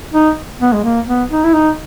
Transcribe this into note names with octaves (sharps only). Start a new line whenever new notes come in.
D#4
B3
G#3
A#3
B3
D#4
E4
D#4